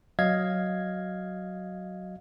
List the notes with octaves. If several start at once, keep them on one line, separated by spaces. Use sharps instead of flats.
F#3 D#5 F5 G#6